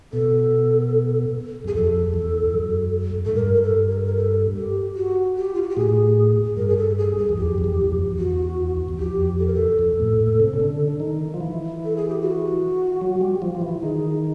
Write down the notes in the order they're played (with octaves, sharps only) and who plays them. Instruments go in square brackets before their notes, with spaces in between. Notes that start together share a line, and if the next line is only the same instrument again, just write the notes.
[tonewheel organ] B2 [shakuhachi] A4
[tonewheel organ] F#2 [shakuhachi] G#4
[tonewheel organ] F2 [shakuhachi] A4
[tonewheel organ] E2
F#2
[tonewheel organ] G#2 [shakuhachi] A4
[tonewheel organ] G2 [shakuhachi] A#4
[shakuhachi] A#4
A4
A#4
A#4
A4
G4
F#4
G4
F4
F#4
G4
[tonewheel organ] A2 [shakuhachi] G#4
[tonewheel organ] G2 [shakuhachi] A#4
[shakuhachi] G#4
A4
G#4
G#4
[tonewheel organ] E2
[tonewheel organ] F2 [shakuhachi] G4
[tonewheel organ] F2
E2
F#2
F2
[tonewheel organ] E2 [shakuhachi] F#4
[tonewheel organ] E2
[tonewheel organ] F2 [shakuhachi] G4
[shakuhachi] A4
A#4
A4
[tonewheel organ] F2
A2
A2
C3
C#3
D3
D#3
F3
E3
[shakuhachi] A4
G#4
G4
F#4
[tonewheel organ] F#3
G3
F3
F3
E3
[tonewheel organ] D#3 [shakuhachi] G#4